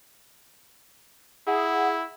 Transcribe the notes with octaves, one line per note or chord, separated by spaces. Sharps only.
E4 G#4 F#5